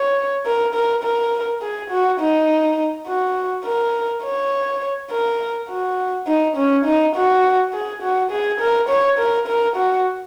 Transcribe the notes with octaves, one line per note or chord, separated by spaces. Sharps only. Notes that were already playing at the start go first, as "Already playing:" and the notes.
Already playing: C#5
A#4
A#4
A#4
G#4
F#4
D#4
F#4
A#4
C#5
A#4
F#4
D#4
C#4
D#4
F#4
G#4
F#4
G#4
A#4
C#5
A#4
A#4
F#4